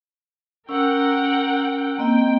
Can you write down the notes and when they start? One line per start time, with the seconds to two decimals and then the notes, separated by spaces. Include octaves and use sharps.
0.69 C#4 A#4 F#5 G5 E6
1.98 A#3 C4 D#5 G5